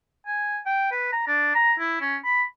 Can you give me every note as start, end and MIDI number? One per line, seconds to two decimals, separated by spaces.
0.27 0.58 80
0.66 0.91 79
0.91 1.12 71
1.13 1.25 82
1.28 1.54 62
1.55 1.73 82
1.79 2.01 64
2.01 2.17 61
2.24 2.43 83